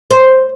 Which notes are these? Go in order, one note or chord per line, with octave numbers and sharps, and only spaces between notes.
C5